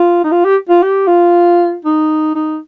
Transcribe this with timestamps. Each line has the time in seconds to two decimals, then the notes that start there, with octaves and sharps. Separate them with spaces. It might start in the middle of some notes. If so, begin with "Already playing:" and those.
Already playing: F4
0.24 D#4
0.32 F4
0.44 G4
0.69 F4
0.83 G4
1.07 F4
1.85 D#4
2.35 D#4